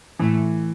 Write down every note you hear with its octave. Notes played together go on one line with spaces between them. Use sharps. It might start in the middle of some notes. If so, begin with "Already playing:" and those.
A2 E3 A3